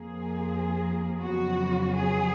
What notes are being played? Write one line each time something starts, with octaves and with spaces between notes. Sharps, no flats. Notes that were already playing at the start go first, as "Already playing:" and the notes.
Already playing: F2 F3 A#3 G#4
F2 C#3 F#3 B3 F#4
G#4